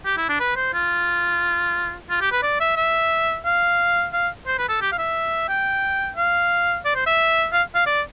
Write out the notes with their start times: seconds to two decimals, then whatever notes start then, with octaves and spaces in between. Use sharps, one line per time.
0.05 G4
0.17 E4
0.29 D4
0.40 B4
0.56 C5
0.74 F4
2.10 F4
2.21 G4
2.32 B4
2.43 D5
2.60 E5
2.76 E5
3.45 F5
4.13 F5
4.47 C5
4.59 B4
4.69 A4
4.81 G4
4.92 F5
4.98 E5
5.48 G5
6.16 F5
6.85 D5
6.95 C5
7.06 E5
7.52 F5
7.75 F5
7.86 D5